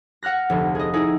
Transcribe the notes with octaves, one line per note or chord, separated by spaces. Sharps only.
F#5 F6 F#6 A#6
F1 D2
G#4 D#5
D#4 E4 G#4